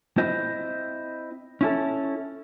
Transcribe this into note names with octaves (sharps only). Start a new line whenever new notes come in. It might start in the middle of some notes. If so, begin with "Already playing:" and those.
C4 E4 C5 D#5
C#4 E4 A4